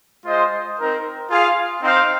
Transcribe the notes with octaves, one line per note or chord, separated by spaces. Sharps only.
G#3 F4 C5 D#5
C4 D#4 A#4
F4 G#4 F5
C4 D#4 C5 F5